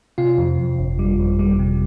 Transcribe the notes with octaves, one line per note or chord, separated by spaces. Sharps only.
C3 F4
F2
F2
G1
G3
F2
G3
C3